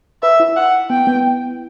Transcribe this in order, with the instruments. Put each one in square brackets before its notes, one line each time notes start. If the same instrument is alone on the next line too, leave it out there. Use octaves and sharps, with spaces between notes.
[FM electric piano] B4 [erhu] E5
[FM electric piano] E4
[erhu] F#5
[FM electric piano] B3 [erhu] G5
[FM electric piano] B3